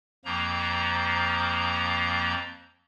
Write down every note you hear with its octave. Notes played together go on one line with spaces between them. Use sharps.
F2 F3 A#3 A#5